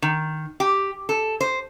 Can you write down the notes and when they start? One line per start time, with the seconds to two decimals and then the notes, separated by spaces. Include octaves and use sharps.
0.02 D#3
0.60 G4
1.09 A4
1.41 C5